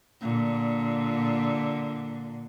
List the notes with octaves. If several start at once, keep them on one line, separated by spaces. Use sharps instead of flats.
A#2 D3